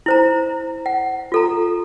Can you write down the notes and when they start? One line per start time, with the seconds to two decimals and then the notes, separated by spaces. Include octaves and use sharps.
0.06 E4 C5 A#5
0.86 F#5
1.32 F4 A4 A#5